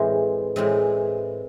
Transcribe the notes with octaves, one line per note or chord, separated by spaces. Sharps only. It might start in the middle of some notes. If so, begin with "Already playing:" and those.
Already playing: A2 E3 G#3 C4 C5
A2 E3 G#3 C4